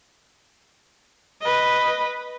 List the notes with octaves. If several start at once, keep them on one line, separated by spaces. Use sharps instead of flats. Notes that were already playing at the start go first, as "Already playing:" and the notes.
B4 D#5